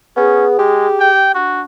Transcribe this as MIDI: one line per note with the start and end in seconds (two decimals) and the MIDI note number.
0.17 0.56 59
0.17 0.46 61
0.17 1.09 68
0.59 0.87 56
0.59 1.38 67
1.00 1.33 79
1.35 1.64 62
1.35 1.62 66